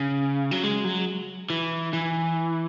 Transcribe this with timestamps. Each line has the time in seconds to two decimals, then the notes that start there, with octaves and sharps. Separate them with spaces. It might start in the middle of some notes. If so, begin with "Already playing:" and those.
Already playing: C#3
0.51 F#3
0.64 G#3
0.85 F#3
1.50 E3
1.93 E3